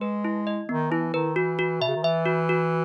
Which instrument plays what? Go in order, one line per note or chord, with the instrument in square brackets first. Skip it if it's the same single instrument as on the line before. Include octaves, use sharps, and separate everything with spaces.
[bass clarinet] G#3 [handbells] B4
[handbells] E4
D#5
[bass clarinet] D#3 [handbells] B3
[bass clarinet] E3 [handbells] E4
[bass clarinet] D#3 [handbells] B4
[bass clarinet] E3 [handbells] F#4
[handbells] F#4
[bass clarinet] B2 [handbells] E5
[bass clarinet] C#3
D#3
[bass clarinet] E3 [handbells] E5
[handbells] F#4
F#4